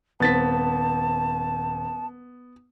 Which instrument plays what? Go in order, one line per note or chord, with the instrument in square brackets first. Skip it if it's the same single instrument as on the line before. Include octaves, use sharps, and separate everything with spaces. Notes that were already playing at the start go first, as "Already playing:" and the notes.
[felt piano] D#1 C4 [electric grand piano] B3 A6 B6 [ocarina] A5